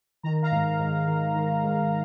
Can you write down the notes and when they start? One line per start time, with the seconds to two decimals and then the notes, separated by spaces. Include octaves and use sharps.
0.23 D#3 A#5
0.42 F5 A#5
0.51 G#2
0.79 G#2
1.07 D#3
1.35 D#3
1.63 G#2